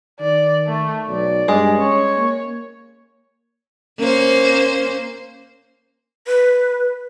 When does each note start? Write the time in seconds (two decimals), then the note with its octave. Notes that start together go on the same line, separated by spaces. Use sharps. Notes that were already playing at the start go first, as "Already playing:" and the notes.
0.20 D#3 D5
0.67 A3
1.08 B1 D5
1.48 G2 G#3
1.78 C#4 C#5
2.17 A#3
3.99 A#3 C#4 C5
6.27 B4